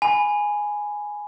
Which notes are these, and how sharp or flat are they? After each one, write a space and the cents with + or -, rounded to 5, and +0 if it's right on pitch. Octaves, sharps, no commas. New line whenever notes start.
G#5 +0 B5 +5